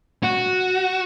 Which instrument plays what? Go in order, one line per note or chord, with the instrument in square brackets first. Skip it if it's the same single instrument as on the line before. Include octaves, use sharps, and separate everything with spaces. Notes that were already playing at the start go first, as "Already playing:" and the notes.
[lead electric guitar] F#4